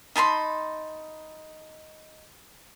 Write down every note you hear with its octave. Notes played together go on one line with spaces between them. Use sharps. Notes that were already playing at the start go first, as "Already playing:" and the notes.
D#4 A5 B5 C6